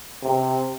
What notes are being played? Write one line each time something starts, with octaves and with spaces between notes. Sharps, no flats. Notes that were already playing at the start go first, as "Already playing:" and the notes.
C3